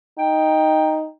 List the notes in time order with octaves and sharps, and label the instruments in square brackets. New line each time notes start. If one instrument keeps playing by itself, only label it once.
[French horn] D#4 [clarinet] G5